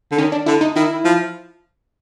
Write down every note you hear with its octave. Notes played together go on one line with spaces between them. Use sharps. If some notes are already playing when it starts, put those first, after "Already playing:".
D3
D#3 C#4
D4
D3 E4
D#4
D#3 E4
F3